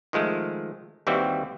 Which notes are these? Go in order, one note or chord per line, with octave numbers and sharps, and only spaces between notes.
D#3 F3 G#3 A3
D#2 E3 G3 C4 E4 F#4